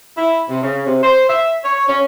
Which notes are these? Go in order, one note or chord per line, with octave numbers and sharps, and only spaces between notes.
E4
C3
C#3
C3
C5
E5
C#5
C#4